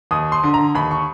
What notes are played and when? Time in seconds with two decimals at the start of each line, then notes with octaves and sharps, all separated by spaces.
0.11 D#2 D#6
0.32 C6
0.43 D3
0.54 A#5
0.75 D#2 B5
0.91 C#6